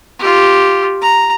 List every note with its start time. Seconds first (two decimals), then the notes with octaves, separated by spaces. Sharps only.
0.19 F4 G4
1.02 A#5